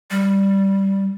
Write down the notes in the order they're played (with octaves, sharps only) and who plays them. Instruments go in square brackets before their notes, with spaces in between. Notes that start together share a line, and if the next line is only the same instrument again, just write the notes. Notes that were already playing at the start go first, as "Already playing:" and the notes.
[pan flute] G3